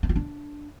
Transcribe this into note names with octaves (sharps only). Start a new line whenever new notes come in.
D4
F4
D4